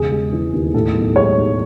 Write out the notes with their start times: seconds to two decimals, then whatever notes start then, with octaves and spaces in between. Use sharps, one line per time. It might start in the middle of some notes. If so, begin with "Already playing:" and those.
Already playing: E1 C#3 G#4
0.11 G#3
0.32 E3
0.54 D#2
0.74 A2 A4
0.95 B1
1.16 G#3 C#5
1.36 B1